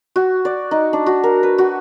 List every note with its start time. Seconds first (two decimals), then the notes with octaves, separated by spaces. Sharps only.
0.16 F#4
0.45 D5
0.71 D#4
0.93 D4
1.06 F#4
1.23 A#4
1.43 B4
1.58 F#4